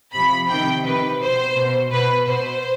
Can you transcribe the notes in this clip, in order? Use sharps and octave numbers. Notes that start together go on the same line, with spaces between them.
C3 F3 B5
C3 D#3 G5
C3 D#3 B4
B2 C5
B2
B2 B4
B2 C5